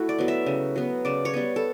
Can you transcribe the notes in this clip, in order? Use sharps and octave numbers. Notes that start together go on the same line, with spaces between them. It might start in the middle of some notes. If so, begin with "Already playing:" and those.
Already playing: A3 E4 F#4
D5
F#3 B3
E5
C#3
F#3 B3
C#3 D5
C#5
G3 B3
A4